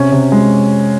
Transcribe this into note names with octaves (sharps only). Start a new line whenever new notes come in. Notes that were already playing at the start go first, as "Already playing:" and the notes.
Already playing: C3 C#4
C3
G#3